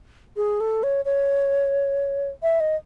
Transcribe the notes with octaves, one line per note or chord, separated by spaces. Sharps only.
G#4
A4
C#5
C#5
E5
D#5